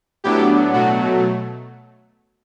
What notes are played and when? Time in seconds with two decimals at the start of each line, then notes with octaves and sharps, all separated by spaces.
0.24 A2 F#3 B3 D4 E4 G4
0.73 B2 F#3 A3 F#4